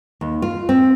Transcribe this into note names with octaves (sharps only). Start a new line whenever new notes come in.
D#2
F4
C4